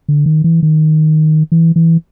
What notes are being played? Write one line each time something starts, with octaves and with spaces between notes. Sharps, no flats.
D3
D#3
E3
D#3
E3
E3